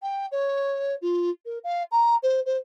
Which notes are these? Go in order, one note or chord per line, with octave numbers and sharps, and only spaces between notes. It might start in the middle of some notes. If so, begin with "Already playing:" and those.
G5
C#5
F4
A#4
F5
A#5
C5
C5